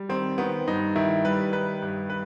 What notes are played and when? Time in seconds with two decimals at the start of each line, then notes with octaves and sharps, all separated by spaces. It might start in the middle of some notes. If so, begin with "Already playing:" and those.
Already playing: G3
0.09 D#3 C4
0.38 D#3 B3
0.67 G2 D#4
0.96 D#3 E4
1.25 G3 B4
1.52 D#3 B4
1.82 G2
2.10 B4